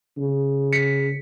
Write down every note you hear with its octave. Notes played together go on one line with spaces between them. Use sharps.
C#3
B6 C#7